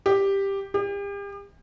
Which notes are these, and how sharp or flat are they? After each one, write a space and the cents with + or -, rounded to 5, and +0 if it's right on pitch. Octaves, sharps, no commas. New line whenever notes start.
G4 +5
G4 +40